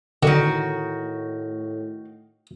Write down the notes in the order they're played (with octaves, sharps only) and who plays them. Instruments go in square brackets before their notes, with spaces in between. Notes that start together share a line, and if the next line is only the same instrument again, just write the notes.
[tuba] A2 [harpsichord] D3 [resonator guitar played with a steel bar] D#3 F#4